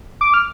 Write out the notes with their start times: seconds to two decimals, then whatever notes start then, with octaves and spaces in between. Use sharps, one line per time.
0.21 D6
0.34 F6